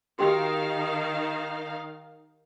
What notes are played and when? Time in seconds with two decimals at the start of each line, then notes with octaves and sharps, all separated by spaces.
0.19 D#3 D#4 F#4 G4 F5 G5